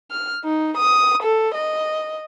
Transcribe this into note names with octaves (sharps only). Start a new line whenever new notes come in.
F6
D#4
D#6
A4
D#5